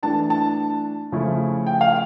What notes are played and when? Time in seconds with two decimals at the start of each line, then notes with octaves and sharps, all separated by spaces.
0.03 E3 A3 D4 A5
0.30 A5
1.12 C#3 F3 A3 E4
1.66 G5
1.81 F5